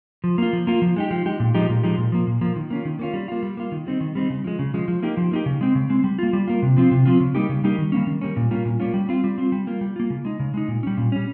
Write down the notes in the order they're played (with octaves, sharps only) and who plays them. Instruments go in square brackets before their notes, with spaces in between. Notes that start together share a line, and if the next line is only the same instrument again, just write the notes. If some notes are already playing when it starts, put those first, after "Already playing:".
[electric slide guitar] F3
A#3 F4
F3
A#3 F4
F3
G#3 D#4 G4
F3
G#3 D#4 G4
A#2
F3 G#3 D#4 G4
A#2
F3 G#3 D#4 G4
A#2
F3 A#3
A#2
F3 A#3
D#3
A#3 C#4 F4
D#3
A#3 C#4 F4
G3
A#3 F4
G3
A#3 F4
D#3
G3 C4 D#4
D#3
G3 C4 D#4
C#3
F3 G#3
C#3
F3 G#3
F3
A#3 D#4 G4
F3
A#3 D#4 G4
C#3
G#3 C4
C#3
G#3 C4
G3
A#3 F4
G3
A#3 F4
C3
F3 C4 F4
C3
F3 C4 F4
C#3
G3 A#3 D#4 G4
C#3
G3 A#3 D#4 G4
D#3
G3 A#3 C#4
D#3
G3 A#3 C#4
A#2
G3 A#3 C#4 F4
A#2
G3 A#3 C#4 F4
G3
C4 F4
G3
C4 F4
G3
A#3 F4
G3
A#3 F4
C#3
G#3 D#4
C#3
G#3 D#4
A#2
G3 C#4
A#2
G3 C#4